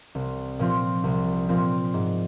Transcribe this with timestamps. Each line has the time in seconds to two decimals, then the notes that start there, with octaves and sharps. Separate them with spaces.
0.15 C2
0.59 A#2 F3 C4 F4
1.04 C2
1.49 A#2 F3 C4 F4
1.94 G#2